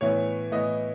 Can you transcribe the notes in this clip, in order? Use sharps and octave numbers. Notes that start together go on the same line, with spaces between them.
A2 E3 B3 E4 C#5
A2 E3 B3 E4 D#5